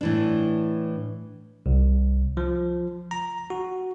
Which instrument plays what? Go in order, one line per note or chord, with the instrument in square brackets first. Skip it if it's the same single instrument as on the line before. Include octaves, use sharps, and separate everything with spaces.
[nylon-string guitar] A2 E3 D4
[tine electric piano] C2
F3
A#5
F#4